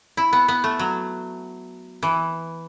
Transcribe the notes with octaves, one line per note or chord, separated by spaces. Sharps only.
E4
B3
B3
A3
F#3
E3